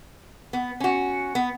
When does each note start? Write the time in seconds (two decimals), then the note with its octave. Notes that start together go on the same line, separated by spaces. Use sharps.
0.53 B3
0.80 C#4 F#4
1.35 B3